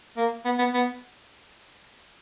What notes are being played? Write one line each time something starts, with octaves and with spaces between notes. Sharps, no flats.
A#3
B3
B3
B3